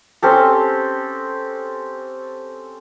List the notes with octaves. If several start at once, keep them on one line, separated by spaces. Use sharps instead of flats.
C4 C#4 G4 A4